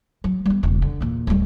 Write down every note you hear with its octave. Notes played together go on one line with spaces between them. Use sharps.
F#3
G3 B3
E1 C#3
D3
E2 A#2
D1 G3